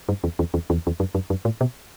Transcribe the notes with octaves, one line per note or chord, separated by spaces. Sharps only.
G2
E2
E2
E2
E2
E2
F#2
F#2
F#2
A2
B2